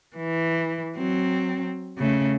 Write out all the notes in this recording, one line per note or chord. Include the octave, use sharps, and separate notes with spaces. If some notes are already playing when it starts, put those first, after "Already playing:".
E3
F#3 C4
C#3 A3